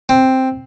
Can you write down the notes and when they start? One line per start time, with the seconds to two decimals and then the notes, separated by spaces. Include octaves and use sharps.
0.09 C4